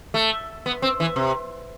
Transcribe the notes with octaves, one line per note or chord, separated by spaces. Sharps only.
A3
B3
C4
E3
C3